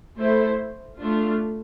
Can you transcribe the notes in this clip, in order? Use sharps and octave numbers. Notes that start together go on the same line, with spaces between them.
A3 E4 A4 C5
A3 D4 F4